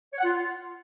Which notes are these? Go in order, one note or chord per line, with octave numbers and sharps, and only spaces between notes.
C#5
F#5
F4